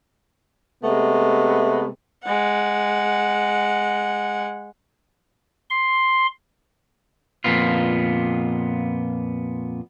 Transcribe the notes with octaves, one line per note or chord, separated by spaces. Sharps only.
C3 G#3 A3 B3
G#3 F#5
C6
F2 A#2 B3 F4